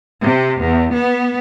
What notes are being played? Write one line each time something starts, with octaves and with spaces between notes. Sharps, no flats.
C3
E2
B3